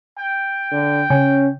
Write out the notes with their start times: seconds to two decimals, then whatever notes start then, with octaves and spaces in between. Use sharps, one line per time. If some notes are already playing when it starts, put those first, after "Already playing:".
0.18 G5
0.71 D3
1.10 C#3 C#4